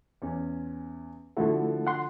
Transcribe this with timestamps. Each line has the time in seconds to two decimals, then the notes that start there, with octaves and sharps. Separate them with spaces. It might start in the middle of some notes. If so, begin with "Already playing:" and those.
0.22 E2 C#4
1.37 D3 F3 A3 E4 F#4 A4
1.87 F#5 C6